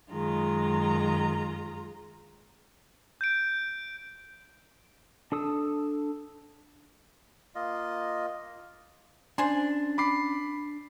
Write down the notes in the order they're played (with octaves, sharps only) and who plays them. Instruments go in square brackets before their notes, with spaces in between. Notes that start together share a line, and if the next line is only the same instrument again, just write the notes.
[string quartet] F#2 D#3 G#3 F4 A#5
[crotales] G6 D7
[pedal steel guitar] D4 A4 D#6 E6
[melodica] A#3 F4 D#5
[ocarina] C#4 [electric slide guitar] D4 [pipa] C5 G#5 C6
[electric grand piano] B5 D6 C7